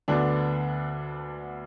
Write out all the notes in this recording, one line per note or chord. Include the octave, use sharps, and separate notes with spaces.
D2 D3 B3 D4 B4